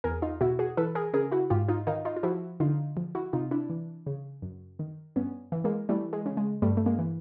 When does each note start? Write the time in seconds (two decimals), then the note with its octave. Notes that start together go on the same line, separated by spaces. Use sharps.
0.04 E2 G#4 A#4
0.22 D#4 F4
0.41 B2 E4 F#4
0.59 F#4 G#4
0.77 E3 A4 B4
0.95 G#4 A#4
1.14 C#3 G#4 A#4
1.32 E4 F#4
1.50 G#2 F4 G4
1.69 D#4 F4
1.87 D#3 D#4 F4
2.05 D#4 F4
2.16 F4
2.23 F3 E4 F#4
2.60 D3 D#4 F4
2.97 F3
3.15 E4 F#4
3.33 C3 D#4 F4
3.51 D4 E4
3.70 E3
4.06 C#3
4.42 F#2
4.79 D#3
5.16 G2 B3 C#4
5.52 E3
5.64 G#3 A#3
5.89 E3 G3 A3
6.13 G#3
6.26 C#3
6.37 G#3
6.62 G2 G3 A3
6.77 A3
6.86 G#3 A#3
6.99 E3